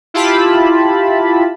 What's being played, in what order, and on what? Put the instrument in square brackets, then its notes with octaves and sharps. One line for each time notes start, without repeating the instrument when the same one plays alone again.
[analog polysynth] E4 F4 G4 A5 B5